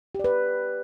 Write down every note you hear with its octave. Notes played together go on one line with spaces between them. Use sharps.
G4 B4 D5